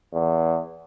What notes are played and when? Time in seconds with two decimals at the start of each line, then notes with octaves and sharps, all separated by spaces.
0.14 E2